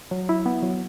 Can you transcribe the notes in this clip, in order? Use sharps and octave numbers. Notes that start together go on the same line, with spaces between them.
F#3
E4
B3
F#3